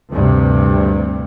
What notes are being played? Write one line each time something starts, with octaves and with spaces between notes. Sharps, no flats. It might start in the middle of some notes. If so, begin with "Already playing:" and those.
D2 G2 C3